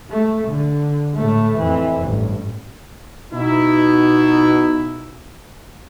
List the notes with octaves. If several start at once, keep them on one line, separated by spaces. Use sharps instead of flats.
A3
D3
A2 A3
F2 E3
A1 G2
B2 D#4 E4